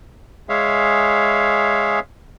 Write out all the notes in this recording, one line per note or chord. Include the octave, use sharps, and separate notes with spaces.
G#3 G#4 C#5 E5 F5